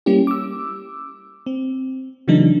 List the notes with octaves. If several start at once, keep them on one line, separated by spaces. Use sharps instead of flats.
G3 A#3 C#4 E4 G4
D6 E6
C4
C#3 E3 F#3 A3 D4 D#4